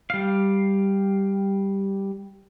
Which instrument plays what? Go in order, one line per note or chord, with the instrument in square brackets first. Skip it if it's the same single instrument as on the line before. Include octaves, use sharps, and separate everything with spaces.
[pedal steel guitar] G3 F5